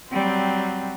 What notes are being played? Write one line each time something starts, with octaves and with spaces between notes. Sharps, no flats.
F#3 G3 C4